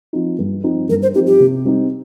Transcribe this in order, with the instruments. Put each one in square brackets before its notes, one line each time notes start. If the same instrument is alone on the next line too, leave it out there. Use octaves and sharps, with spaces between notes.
[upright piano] F3 C4 D#4
G2
F3 C4 D#4
[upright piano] G2 [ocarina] A#4
[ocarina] C5
[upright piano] F3 C4 D#4 [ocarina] G4
[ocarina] G4
[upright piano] C3
G3 C4 D#4